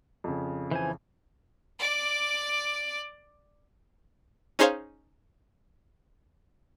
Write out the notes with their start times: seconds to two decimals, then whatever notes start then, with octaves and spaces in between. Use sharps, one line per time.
0.24 F2 C#3
0.71 E3 C5 G#5
1.79 D5 D6
4.59 C#4 D#4 G#4 C5 C#5 F5